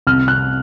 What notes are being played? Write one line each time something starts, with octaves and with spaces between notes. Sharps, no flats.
C2 F6
F#6